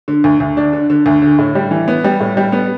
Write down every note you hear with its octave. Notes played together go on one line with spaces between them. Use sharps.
D3
D2
D2
D4
D3
D3
D2
D3
A2
G3
E3
B3
G3
A2
G3
B3